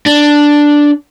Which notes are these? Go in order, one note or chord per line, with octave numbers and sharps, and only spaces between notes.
D4